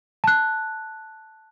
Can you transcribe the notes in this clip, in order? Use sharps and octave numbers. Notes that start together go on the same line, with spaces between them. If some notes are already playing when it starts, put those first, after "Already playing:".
A5 F#6